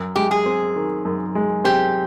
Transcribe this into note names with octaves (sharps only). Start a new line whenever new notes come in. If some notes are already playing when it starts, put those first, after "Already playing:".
Already playing: F#2
G#3 G4
G#4
C4
D#3
F#2
G#3
C4 G4